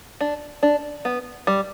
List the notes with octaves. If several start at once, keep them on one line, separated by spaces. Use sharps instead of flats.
D4
D4
B3
G3